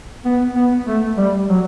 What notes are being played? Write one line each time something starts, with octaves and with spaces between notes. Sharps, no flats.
B3
B3
A3
G3
F#3